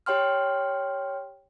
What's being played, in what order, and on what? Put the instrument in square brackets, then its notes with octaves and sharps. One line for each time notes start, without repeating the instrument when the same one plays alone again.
[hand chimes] G4 C#5 G5 C6 F6